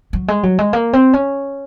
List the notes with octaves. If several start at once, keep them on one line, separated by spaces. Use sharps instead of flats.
F#3
G#3
F#3
G#3
A#3
C4
C#4